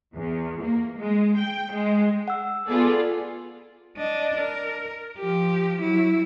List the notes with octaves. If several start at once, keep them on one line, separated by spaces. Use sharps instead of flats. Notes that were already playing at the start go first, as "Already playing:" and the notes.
E2
A#3
G#3
G5
G#3
F#5 E6
B3 F4 G#4 A4 D5
D4 D#5
A#4
F3 G4
F#3 E4